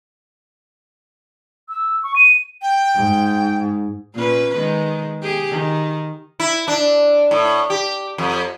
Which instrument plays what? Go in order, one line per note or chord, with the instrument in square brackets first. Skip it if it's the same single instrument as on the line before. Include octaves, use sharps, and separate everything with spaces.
[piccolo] E6
C#6
D#7
[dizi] G5
[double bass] G#2
[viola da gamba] A#2 C#4 B4
D#3 G#3
G4 G#4
D#3
[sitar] E4
D4
A2
G4
F2